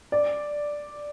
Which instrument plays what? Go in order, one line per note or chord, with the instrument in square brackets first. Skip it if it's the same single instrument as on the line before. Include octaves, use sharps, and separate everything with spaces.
[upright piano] D5